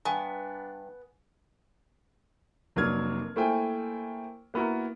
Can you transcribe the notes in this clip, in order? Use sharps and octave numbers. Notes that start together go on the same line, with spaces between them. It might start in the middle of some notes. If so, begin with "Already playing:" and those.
G2 B3 D4 G#5
F1 F#3 A#3 D4 F6 G#6
A3 A#3 E4 C5 G5 G#5
A#3 B3 E4 F#4 A#4